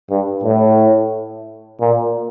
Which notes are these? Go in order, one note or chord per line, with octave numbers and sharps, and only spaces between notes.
G2
A2
A#2